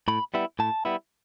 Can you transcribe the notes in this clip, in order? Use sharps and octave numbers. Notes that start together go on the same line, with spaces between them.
A2 B5
G3 B3 E4
A2 A5
G3 B3 E4